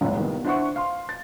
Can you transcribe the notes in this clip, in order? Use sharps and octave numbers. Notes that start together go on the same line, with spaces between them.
F#1 C#2 G#2
C2 D#3 B3
D4 E4 C5 F#5 C#6
F5 C6
A6